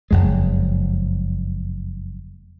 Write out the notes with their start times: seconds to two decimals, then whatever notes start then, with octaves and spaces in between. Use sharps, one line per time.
0.11 F#1 F2 G#3